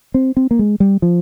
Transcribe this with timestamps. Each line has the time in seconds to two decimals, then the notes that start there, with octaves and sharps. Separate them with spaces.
0.14 C4
0.37 C4
0.51 A#3
0.59 G#3
0.80 G3
1.02 F3